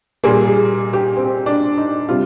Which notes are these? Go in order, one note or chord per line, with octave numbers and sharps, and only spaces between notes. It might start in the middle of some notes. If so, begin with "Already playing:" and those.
A#2 G3 A#3 G#4
G#4
G4
C4
D4
D#4
C3 G3 F4